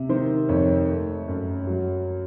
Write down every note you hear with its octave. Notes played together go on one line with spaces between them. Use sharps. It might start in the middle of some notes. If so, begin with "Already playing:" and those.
Already playing: C3
D#3 C5
F2 C#5
A3
F#2
F#3